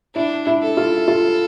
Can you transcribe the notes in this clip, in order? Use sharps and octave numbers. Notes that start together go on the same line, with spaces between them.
D4 E4
E4
A4
F4
F4